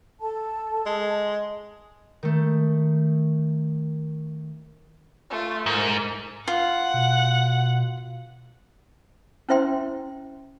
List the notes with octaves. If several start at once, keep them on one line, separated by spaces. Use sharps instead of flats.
A4 A5
G#3
D#3 A3
A3 F4
G#2 A#4
F4 F#5
B2
C#4 E4 C5 E5 G5 C6